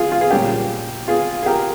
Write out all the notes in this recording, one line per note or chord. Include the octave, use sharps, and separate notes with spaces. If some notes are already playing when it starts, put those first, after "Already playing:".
Already playing: F4 G#4
F4
G#4
A#2 G3 C#4 G4
F4 G#4
G#4
G4 A#4